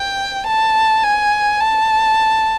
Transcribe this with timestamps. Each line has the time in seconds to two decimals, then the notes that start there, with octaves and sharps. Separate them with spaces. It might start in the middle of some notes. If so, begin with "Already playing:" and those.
Already playing: G5
0.47 A5
1.03 G#5
1.60 A5